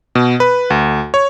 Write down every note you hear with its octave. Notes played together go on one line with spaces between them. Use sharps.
B2
B4
D2
C#5